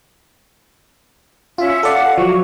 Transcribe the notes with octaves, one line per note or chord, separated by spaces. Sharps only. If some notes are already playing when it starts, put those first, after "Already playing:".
C#4 F4 E5
A4 D5 F5 F#5
F3 F#3 C#6